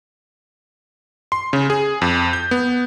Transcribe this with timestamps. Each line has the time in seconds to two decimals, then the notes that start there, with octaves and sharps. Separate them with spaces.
1.32 C6
1.53 C#3
1.70 G#4
2.02 F2
2.33 G6
2.51 B3